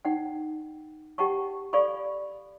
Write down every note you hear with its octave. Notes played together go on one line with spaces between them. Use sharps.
D#4 F#5 G5
G4 F#5 G5 A5 C#6
A4 D5 F5 B5 C#6